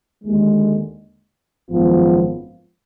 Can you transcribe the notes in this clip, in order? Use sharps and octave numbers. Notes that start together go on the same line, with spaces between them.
D#2 D3 G#3
G#1 F#2 F3 B3 F4